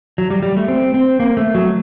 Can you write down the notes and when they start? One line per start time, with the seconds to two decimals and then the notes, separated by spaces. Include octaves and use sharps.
0.18 F#3
0.30 G3
0.43 G3
0.57 A3
0.68 C4
0.94 C4
1.20 A#3
1.37 A3
1.54 F#3